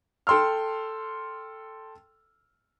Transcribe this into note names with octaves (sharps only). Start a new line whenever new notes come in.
A4 G5 C6 E6 F6